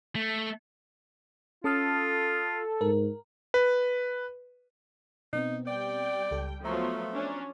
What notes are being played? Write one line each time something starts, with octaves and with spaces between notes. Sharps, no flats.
A3
C#4 F4 A4 D#6 F6
G#2 A#4
B4
B2 B3 C4 D#4
G3 D5 G5
C#2 A4
F3 F#3 A3 B3 A#5 C6 C#6
C#4 D4